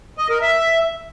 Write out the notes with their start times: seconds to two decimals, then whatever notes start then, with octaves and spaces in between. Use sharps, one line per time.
0.18 D#5
0.30 A#4
0.42 E5